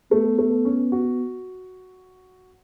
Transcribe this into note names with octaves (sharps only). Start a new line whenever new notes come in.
A3 B3
A3
C#4
F#4